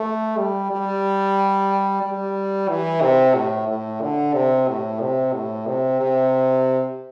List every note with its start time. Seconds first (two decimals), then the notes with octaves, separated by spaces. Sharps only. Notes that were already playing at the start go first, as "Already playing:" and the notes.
Already playing: A3
0.38 G3
0.71 G3
2.03 G3
2.69 E3
3.02 C3
3.35 A2
3.68 A2
4.02 D3
4.34 C3
4.68 A2
5.01 C3
5.33 A2
5.67 C3
6.00 C3